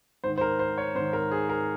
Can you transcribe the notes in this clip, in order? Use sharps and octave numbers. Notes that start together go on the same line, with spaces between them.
G#2 D#3 C5
C5
A#4
C5
C#5
G#2 D#3 C5
A#4
G#4
A#4